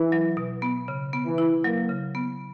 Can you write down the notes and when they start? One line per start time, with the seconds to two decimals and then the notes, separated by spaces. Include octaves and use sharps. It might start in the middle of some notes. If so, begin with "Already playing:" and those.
Already playing: E3 E4
0.12 F#3
0.37 B2
0.62 B3
0.88 C#3
1.13 B3
1.26 E3
1.38 E4
1.64 F#3 A#3
1.89 C#3
2.15 B3